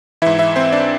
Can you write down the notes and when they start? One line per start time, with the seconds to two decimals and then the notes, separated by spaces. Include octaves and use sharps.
0.22 G#2 E3 E4 E5
0.39 E4 E5
0.56 C4 C5
0.72 D4 D5